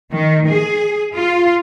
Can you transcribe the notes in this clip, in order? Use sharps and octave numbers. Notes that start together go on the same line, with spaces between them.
D#3
G#4
F4